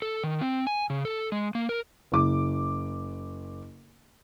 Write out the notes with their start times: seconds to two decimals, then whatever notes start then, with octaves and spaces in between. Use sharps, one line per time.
0.02 A4
0.24 D#3
0.41 C4
0.67 G#5
0.90 C#3
1.05 A4
1.32 G#3
1.55 A#3
1.69 A#4
2.12 F#1 D6